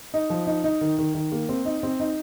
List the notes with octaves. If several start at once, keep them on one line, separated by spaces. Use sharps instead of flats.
D#4
F3
D#4
D#4
D#3
D#3
D#3
A#3
C4
D#4
C4
D#4